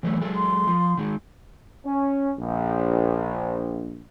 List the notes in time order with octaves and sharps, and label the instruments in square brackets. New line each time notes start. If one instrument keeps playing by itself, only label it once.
[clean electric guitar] E3 F#3 A3
F#3 G#3 A4
[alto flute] C6
[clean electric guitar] F3
D#3 G#3
[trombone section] C#4
A#1